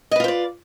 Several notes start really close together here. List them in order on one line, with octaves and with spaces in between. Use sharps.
D#5 B4 F4 C5 D5